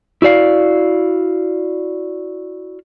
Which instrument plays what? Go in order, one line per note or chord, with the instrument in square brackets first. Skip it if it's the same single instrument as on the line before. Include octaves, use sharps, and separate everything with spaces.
[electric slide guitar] E4 F#4 D5 F5